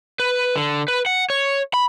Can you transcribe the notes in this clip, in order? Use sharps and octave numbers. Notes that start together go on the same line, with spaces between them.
B4
D3
B4
F#5
C#5
B5